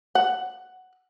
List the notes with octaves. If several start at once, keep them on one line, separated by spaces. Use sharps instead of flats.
F#5